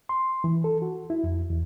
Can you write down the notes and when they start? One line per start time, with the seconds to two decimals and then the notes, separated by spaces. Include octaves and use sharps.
0.09 C6
0.44 E3
0.64 A4
0.82 F#4
1.10 E4
1.24 F2
1.50 E2